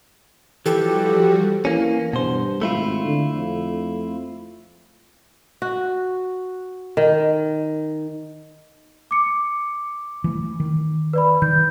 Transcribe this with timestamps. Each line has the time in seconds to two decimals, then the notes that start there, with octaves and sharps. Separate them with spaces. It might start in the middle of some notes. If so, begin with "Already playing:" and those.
0.66 E3 F3 G3 F#4 G4 A4
1.65 E3 A#3 C#4
2.13 G2 B2 C5
2.62 G#1 A3 E4 F4
3.04 D3
3.34 F2
5.62 F#4
6.97 D#3
9.11 D6 C#7
10.24 E3 A3
10.60 D#3
11.13 B4 D5 B5
11.42 D#3 G6